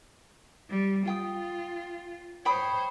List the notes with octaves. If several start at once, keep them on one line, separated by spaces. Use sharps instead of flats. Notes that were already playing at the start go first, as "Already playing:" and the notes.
G3
F4 G5 D#6
C5 C#5 G5 B5 D#6